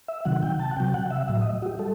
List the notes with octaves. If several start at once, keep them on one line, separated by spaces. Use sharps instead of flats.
E5
C3 D#3 F#3 F#5
G5
A5
F#5
C3 F#3 G5
F#5
E5
A2 F#3 E5
D#5
F#4
G4
G3 A4